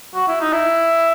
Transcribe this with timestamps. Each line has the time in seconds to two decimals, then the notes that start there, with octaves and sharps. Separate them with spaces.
0.14 F#4
0.28 E4
0.40 D#4
0.53 E4